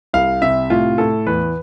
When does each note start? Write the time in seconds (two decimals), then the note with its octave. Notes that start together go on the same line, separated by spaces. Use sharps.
0.13 C2 F5
0.42 C3 E5
0.70 A2 F4
0.98 A2 A4
1.27 E2 B4